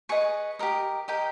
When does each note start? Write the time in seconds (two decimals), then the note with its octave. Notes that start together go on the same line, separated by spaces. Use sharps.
0.09 G#4 B4 D#5 C#6
0.59 G4 A#4 D#5
1.08 G4 A#4 D#5 G5